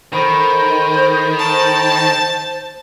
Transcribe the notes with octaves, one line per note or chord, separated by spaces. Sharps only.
D#3 A4 C5 B5
A5